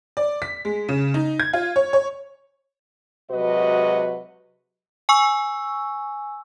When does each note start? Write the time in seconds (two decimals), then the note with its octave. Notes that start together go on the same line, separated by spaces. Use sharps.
0.17 D5
0.42 B6
0.65 G#3
0.89 C#3
1.14 D#4
1.40 G#6
1.53 F4
1.76 C#5
1.93 C#5
3.31 C3 F#3 G#3 F#4 B4 D#5
5.09 G#5 C#6 E6